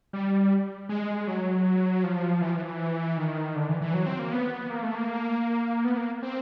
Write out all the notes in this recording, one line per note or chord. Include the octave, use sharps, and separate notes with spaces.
G3
G#3
F#3
F3
E3
F3
E3
D#3
D3
E3
E3
F#3
C4
A#3
B3
A#3
A3
A#3
B3
A#3
C4